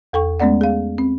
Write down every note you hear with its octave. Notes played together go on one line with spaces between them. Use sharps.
E2 A4 G5 C#6
G#3 A3 B3 C#4 D5 F#5
G#4 F5
C4